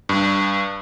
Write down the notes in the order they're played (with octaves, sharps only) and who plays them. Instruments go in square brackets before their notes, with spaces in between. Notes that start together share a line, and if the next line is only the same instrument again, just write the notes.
[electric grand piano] G2